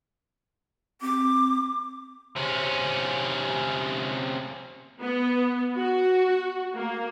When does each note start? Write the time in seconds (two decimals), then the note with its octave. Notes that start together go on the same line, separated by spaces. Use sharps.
1.02 C4 D6
2.36 C3 C#4
4.99 B3
5.76 F#4
6.74 A#3